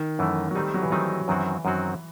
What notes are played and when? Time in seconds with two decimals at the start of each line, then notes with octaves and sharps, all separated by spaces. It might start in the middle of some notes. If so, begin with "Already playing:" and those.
Already playing: D#3
0.19 F#2 E3 A3
0.51 F#3
0.55 D#3 G3 A3 C4 D#4
0.74 F#3
0.82 E3
0.90 D#3 F#3 A3 C4 D#4
1.28 F#2 D#3 E3 F#3 C4 F#4
1.65 F#2 D#3 F#3 C4 F#4